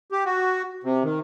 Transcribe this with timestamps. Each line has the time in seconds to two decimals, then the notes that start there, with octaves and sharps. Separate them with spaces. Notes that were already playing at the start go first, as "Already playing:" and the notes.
0.12 G4
0.25 F#4
0.84 C3
1.04 D#3